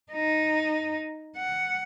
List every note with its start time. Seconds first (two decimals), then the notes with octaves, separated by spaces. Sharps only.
0.12 D#4
1.37 F#5